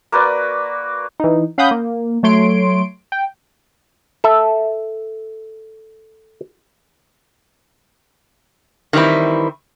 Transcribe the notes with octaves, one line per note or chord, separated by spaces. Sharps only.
A#3 F#4 B4 D5
E3 D#4
C#4 F5 F#5 B5 D#6 G6
A#3
F#3 A3 C#5 C6 D7
G5
A4 E5
D#3 E3 G3 C4 E4